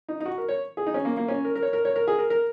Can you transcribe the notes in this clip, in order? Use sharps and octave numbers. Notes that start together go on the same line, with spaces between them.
D#4
D#4
F#4
A#4
C#5
G#4
D#4
C#4
A#3
A#3
C#4
A#4
A#4
C#5
A#4
C#5
A#4
G#4
A#4
A#4